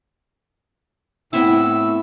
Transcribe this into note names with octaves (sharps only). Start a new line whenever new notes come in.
A2 B3 C4 E4 E6